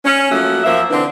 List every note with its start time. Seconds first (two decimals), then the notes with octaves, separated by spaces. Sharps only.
0.04 C#4
0.30 F3 F#3 A3 A#3 F#4
0.64 F#2 F3 A#3 E5
0.90 D3 E3 C4 D4 C5